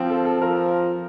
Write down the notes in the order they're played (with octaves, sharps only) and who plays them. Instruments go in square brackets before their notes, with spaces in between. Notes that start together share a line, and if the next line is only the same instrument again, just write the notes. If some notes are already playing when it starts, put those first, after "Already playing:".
Already playing: [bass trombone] F3 [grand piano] C4
[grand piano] A4
A4
[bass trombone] F3 [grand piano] A#4